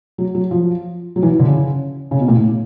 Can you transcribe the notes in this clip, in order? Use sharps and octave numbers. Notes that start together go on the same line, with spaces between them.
F#3
F#3
F3
F#3
E3
D3
C#3
C#3
B2
A#2
A2